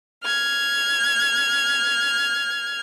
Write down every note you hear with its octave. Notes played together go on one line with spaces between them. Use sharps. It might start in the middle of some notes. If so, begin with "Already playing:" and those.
F6 G#6